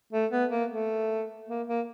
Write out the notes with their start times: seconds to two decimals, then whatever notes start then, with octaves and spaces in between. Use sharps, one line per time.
0.13 A3
0.31 B3
0.51 A#3
0.71 A3
1.49 A#3
1.68 A#3